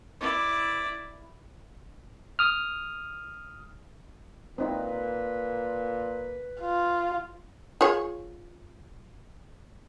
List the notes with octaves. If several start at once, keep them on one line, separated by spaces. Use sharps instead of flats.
E4 D5
D#6 F6
A#2 C4 D#4 E4 B4
F4
F4 G#4 C#5